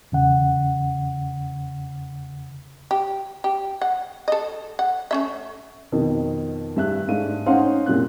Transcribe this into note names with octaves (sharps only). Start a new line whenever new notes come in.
E2 C#3 F#5
G4
G4
F#5
A4 D#5
F#5
A3 C#4 E5
F2 B2 D#3
G2 E5 F#6
G#2 A3 D4 F5 D#7
C#4 D#4 C5 F5 F#5 C6
C2 F#2 A#2 F#6